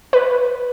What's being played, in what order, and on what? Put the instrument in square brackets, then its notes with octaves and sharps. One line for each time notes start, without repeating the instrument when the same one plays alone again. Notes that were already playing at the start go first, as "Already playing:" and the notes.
[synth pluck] B4